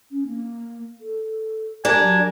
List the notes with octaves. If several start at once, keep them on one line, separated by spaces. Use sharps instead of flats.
C#4
A#3
A4
D4 G4 A#4 G#5
F#3